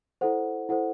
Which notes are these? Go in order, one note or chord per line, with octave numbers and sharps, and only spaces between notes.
E4 A4 C5 F#5
E4 A4 C5 F#5